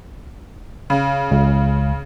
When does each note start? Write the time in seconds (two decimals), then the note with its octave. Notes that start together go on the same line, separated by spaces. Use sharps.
0.90 C#3
1.31 C#2